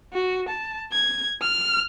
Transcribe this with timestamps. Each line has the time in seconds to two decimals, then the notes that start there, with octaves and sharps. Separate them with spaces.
0.13 F#4
0.48 A5
0.92 G#6
1.42 F6